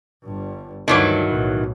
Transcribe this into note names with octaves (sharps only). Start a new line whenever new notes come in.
G1 G2
D2 G2 D#3 E3 F#3
B1 A2